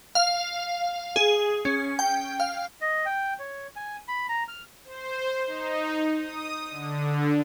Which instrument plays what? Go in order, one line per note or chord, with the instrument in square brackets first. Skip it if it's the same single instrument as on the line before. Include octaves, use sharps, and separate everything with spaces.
[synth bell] F5
G#4
C#4
G5
F5
[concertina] D#5
G5
C#5
G#5
B5
A#5
F6
[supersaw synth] C5
D#4
D#6
D3